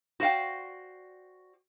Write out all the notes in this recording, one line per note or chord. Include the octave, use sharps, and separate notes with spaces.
F#4 C5 D5 F5 G5